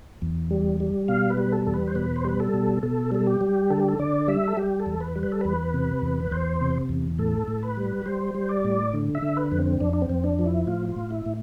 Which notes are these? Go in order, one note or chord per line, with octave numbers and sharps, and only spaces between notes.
E2
G3
G3
B2 F5
B4
G3
A4
E2 A4
B4
C5
B2 B4
C5
G3 B4
A4
B2
B2 A4
G3 A4
G4
G3
D3 A4
G4
A4
D3 D5
G3 E5
A4
G3 G4
A4
E2
B4
G3
B4
A4
E2 B4
C3
E2
E2 C5
C3
E2
A2 A4
A2
B4
G3
G3 C5
G3
D5
A2
D3
E5
D3
B4
F2
C4
F2 D4
D4
C4
F2
D4
F3
E4
A2 F4
F4
A2
E4
A2